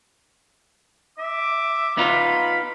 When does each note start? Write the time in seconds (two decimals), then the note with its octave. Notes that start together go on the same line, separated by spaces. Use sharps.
1.18 E5 D6
1.97 B3 D#4 F4 B5